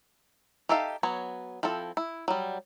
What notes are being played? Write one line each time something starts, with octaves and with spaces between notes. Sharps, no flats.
D#4 G4 A4 E5 F5
F#3 B3 C#5
F3 C4 E4 A4
E4
F#3 G3